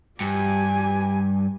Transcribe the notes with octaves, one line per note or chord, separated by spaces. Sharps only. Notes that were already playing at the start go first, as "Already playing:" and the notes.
G2 G4 G#5